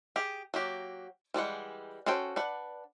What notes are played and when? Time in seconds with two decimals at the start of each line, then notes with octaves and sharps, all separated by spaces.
0.16 G4 G#4
0.54 F#3 A#3 G4
1.34 E3 G3 G#3 F#5
2.06 C#4 F#4 A4 C5 G5
2.36 D4 B4 F#5